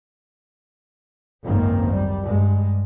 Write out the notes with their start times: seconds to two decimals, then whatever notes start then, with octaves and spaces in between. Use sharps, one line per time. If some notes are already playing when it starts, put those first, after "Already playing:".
1.44 G#1 C#2 F#2 D#3 A#3 C4
1.91 G3
2.22 G2 G#3